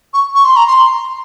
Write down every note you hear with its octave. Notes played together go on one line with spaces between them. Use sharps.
C#6
C#6
C6
A#5
C6